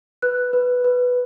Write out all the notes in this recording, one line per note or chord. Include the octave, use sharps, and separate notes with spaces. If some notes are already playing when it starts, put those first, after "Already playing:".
B4 F#6
B4
B4